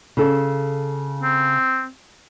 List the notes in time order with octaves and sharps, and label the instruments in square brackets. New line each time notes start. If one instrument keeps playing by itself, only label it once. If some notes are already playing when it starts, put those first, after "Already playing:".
[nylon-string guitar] C#3 A4
[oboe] C4